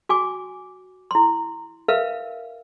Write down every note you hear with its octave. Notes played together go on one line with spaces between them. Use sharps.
F#4 G#5 D6
E4 C6
A#4 B4 E5 F5